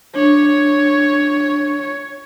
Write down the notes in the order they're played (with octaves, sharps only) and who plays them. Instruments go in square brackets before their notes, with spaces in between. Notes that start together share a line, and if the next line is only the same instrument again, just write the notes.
[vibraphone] D4 [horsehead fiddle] C#5